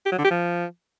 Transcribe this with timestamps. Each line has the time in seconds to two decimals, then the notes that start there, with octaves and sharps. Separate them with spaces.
0.06 G4
0.12 F#3
0.18 D3
0.24 G4
0.31 F3